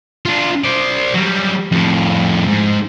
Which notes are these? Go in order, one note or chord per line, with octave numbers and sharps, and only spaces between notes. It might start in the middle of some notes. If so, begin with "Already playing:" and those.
D4 F4
C5 D5
F#3 G3
F2 A2
G#2